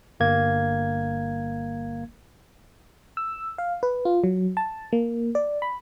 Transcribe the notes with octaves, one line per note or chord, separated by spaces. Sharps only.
G1 A#3 G#6
E6
F5
B4
F4
F#3
A5
A#3
D5
B5